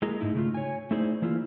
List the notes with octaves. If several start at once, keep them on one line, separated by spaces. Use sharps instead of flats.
G#3 A#3 E4 G#4 D#5 A#5
G#2 A3 D#4 E4
C#3 A3 F4
C#5 G#5
A3 D#4 E4 G#4 C5 D5
E3 A#3 E4 F4